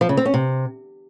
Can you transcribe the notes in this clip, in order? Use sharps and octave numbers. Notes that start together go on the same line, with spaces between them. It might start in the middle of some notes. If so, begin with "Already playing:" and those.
F3
C#3
C4
C#4
C3